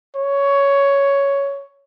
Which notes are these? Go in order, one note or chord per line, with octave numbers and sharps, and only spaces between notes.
C#5